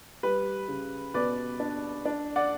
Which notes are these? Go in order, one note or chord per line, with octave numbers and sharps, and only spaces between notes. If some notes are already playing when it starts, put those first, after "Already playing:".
G3 B4
C#3
B2 B4 D5
D4
D4
D5 F#5